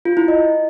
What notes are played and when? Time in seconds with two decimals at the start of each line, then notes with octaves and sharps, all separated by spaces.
0.05 F4
0.17 E4
0.28 D#5